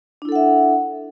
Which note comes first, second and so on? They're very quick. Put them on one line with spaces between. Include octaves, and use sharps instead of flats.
D4 E4 A4 F#5 E5